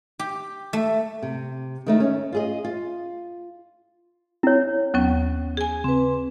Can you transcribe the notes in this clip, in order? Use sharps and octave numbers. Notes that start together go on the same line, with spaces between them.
G4
A3
C3
D#3 A3 D#4
C#4
F4 G#4 D#5
F4
C4 E4 C#5
D#2 F#3 B3 C#4
G#4 G#5
C#3 C4 B4